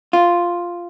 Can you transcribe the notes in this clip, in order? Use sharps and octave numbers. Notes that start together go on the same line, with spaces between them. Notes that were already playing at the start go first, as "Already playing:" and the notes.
F4